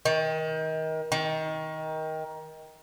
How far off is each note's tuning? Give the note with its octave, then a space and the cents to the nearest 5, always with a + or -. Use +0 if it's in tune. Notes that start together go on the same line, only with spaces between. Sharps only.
D#3 +30
D#3 +20